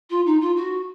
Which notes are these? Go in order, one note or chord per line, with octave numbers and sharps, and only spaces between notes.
F4
D#4
F4
F#4